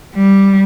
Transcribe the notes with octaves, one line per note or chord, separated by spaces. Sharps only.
G3